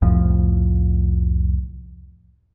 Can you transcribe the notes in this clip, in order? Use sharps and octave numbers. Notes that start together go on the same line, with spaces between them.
C2 F2 A2 F3